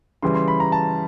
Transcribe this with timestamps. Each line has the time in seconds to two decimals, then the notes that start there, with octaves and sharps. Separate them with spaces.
0.22 C#3 E3 G3 C6
0.35 C6
0.48 B5
0.60 A#5
0.72 A5